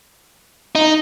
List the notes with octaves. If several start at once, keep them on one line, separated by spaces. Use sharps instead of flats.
D#4